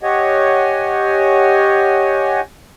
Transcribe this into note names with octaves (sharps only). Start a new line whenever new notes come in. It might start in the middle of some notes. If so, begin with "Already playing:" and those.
G4 C#5 D#5 F#5 G#5